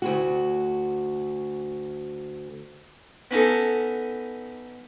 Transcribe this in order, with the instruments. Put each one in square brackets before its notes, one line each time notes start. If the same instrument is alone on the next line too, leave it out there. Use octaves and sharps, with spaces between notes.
[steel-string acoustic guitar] D2 G#2 F#4
[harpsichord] B3 C#4 D#4 A4